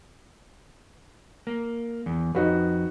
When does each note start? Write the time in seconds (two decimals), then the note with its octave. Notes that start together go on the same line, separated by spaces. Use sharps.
1.47 A#3
2.06 E2
2.35 F2 D#4 F#4 B4